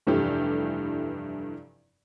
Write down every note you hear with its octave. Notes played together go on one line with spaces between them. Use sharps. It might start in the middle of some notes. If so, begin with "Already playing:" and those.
F1 G2 E3 A3 G4